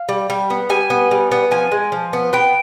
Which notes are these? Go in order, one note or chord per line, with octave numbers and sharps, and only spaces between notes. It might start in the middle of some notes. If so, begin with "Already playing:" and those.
Already playing: F5
G3
G3
B3
G3 G#5
B3
G3
B3
F3 G#5
G#3
F3
B3
B3 G5